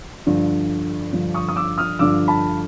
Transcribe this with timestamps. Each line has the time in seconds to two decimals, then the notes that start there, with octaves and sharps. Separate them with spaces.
0.26 G2 D3 F3
1.13 G2 D3 F3
1.34 C#6 D#6
1.49 D#6
1.56 D6 E6
1.78 D#6 F6
1.99 G2 D3 F3 D6 E6
2.28 A5 B5